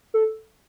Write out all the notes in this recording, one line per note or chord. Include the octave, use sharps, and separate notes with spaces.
A4